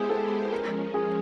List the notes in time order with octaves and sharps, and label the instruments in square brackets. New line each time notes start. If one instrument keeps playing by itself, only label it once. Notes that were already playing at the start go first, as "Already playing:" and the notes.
Already playing: [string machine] G#3 B3 E4 G4 C5 [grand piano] G#4
[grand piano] A4
[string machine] F3 G#3 C#4 [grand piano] A#4
[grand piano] G#4